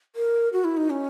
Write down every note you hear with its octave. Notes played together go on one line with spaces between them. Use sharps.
A#4
F#4
E4
D#4
C#4